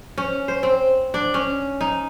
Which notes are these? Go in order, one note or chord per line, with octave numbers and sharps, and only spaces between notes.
C#4
C5
C4
D4
C#4
D#4